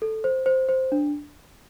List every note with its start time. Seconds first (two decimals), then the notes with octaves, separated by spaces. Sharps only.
0.02 A4
0.24 C5
0.46 C5
0.69 C5
0.92 D4